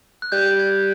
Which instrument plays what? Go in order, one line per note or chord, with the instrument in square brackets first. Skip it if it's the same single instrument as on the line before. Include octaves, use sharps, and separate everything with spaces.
[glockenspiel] F#6
[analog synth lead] G3 [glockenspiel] G6
[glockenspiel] G#6